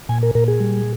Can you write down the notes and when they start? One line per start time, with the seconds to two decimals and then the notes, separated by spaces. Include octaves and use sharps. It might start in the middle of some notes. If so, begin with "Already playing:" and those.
0.09 A#2 G#5
0.23 A#4
0.35 A#2 A#4
0.48 G#4
0.60 G3